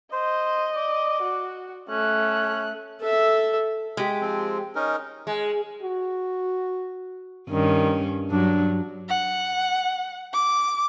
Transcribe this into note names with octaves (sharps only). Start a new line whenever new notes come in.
C5 D#5
D5
F#4
A3 C#4 F#6
A4 E5
G#3 G4
F3 C4
C#4 D#4 A#4
G#3
F#4
G2 D#3 C#4
G2 F#3 D4
F#5
D6